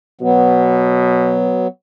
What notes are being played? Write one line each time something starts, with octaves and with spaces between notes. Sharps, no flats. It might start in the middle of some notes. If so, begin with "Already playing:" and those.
B2 F#3 B3